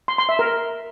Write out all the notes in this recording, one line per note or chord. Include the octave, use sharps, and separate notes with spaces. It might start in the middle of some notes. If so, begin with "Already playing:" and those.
C6
C6
E5
A#4